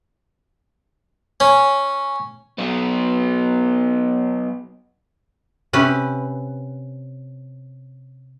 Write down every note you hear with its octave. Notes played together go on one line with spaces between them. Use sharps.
C#4
F#3 B3
C3 C#4 B4